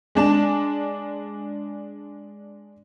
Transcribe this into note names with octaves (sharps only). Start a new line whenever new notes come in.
G#3 D4 A5 E7